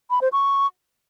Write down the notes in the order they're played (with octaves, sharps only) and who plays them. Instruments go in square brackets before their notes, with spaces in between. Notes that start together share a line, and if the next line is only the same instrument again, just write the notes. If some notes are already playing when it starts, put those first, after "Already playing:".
[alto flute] B5
C5
C#6